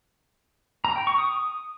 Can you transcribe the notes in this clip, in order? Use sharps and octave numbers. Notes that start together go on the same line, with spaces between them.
A#5
G5
C#6
D#6